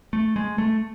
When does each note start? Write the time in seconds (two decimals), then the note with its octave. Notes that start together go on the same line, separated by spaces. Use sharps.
0.13 A3
0.36 G#3
0.58 A3